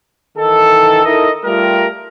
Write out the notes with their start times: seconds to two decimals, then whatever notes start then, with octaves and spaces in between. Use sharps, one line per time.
0.37 D#3 E3 D#4 A4
1.04 D#4 E4 A4 A#4 D#5
1.44 G3 A3 F4 G4 A#4